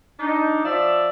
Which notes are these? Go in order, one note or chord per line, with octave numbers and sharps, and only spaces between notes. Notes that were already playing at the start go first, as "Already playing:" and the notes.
D4 D#4
F3 D5 E5